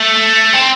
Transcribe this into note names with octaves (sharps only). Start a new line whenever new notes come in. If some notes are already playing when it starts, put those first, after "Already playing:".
Already playing: A3
C4